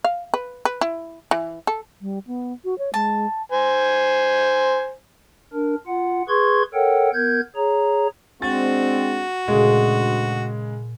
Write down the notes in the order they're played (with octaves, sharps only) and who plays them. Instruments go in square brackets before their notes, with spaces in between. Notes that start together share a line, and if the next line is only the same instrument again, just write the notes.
[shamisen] F5
B4
B4
E4
E3
A4
[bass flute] G3
B3
F#4
C#5
[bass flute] G#3 [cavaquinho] A5
[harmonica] C5 G#5
[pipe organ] D4 A#4
F4 F#5
G#4 B4 C6 C#6 G#6
A4 A#4 C#5 F#5 G5
B3 A#4 G6 G#6
G#4 C#5 A#5
[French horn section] G#3 C4 D4 [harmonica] F#4 [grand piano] A6
[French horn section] D2 [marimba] A#2 [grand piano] C#3 G#3